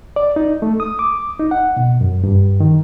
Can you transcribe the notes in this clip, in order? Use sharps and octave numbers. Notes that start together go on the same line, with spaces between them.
D5
D#4
A3
D#6
D6
D#4
F#5
B2
F#2
G2
D#3